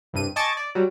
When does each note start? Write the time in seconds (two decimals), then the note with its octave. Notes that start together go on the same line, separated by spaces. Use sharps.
0.13 C2 G2 D#7
0.36 D#5 G#5 A5 C#6 D6 A6
0.57 D5
0.75 F#3 G3